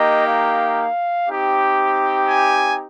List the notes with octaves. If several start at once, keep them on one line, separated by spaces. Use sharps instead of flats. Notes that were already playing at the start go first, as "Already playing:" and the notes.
Already playing: A#3 D#4 G4 D#5
F5
C4 D#4 G4
G#5